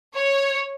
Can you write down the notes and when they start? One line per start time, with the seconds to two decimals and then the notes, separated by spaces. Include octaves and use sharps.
0.16 C#5